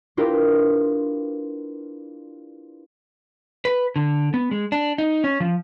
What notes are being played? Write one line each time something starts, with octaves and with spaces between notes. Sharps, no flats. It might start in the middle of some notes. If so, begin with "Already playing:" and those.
D4 E4 F4 G4 A#4 B4
B4
D3
B3
G#3
D4
D#4
C#4
F3